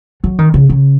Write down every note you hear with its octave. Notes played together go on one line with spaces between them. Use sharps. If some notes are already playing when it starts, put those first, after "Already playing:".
F#3
D#3
C#3
C#3